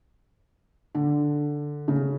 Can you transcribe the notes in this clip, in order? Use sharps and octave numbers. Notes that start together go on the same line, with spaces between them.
D3
C#3